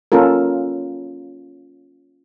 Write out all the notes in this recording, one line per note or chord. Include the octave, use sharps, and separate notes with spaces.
A#3 C#4 F4 A4 A#4